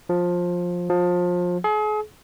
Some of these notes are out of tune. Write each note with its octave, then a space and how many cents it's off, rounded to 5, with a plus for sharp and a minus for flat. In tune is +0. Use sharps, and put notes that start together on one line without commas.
F3 +15
F3 +25
G#4 +40